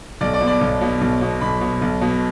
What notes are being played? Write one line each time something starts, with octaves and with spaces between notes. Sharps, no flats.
B1 D5
D5
B2
D5
B1
B2
B1
B2
B1 B5
B2
B1
B2